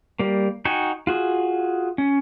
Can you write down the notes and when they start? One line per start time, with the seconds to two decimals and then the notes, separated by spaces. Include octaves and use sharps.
0.19 G3 A#3
0.65 D#4 F#4 G5 G#5
1.07 F4 F#4 G#4
1.98 C#4